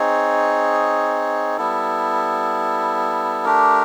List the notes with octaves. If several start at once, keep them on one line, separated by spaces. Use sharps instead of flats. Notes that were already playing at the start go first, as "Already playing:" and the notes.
Already playing: C4 D#4 G#4 C#5
G3 B3 E4 A4
A3 D4 G4 A#4